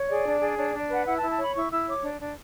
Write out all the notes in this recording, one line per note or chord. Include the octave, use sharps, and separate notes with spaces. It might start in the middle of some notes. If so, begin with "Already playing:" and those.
Already playing: C#5
G#4 D5
D4
G#4
D4 C#5
D4 D5
B4 F#5
E4 F#5
A5
E4
A5
C#5 B5
E4 C#6
E4 E6
C#5 D6
D4
D4